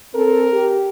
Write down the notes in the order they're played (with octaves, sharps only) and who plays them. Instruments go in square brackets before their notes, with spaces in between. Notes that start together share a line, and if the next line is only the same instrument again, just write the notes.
[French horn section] C4 A4 [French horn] A#4
[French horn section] G4